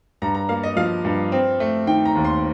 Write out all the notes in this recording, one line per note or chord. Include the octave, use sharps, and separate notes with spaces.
G2 A#5
A#5
A#3 F5
D#5
F3 F5
G2
C4
A3
D#3 G5
A#5
D#2
C6